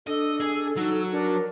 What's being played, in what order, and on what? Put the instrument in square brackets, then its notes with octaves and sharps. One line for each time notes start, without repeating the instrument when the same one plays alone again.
[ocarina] D4 [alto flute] A4 [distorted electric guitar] D#5
[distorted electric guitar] G#4
[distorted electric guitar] F#3 [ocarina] D#4
[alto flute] D4 [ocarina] A#4